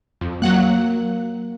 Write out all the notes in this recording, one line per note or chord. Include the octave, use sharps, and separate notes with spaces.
F2
F#3 A#3 F#5 F#6